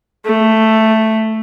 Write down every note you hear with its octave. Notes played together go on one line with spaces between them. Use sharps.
A3